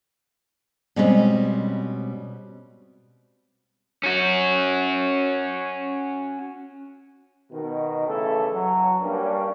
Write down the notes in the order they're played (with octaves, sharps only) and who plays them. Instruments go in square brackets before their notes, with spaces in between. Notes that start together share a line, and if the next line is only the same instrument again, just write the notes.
[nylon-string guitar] B2 G3 G#3 C4 C#4
[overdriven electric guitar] C#4 F#4
[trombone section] B2 D#3
C#3 E3 A3 A4
F#3
G2 G3 A#3 C#4 D4